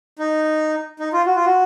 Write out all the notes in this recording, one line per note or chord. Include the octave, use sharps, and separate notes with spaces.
D#4
D#4
F4
F#4
F4
F#4